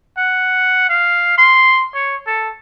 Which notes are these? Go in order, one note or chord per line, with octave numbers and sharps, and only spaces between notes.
F#5
F5
C6
C#5
A4